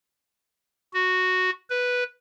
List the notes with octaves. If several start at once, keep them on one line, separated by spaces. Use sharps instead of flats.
F#4
B4